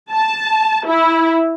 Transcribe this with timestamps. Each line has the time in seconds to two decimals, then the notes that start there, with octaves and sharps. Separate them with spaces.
0.10 A5
0.87 E4